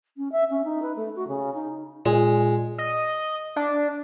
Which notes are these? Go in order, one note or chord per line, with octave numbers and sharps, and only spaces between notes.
C#4
E5
C#4
D#4
B4
A3
F#4
C#3
D#4
A#2 G#3
D#5
D4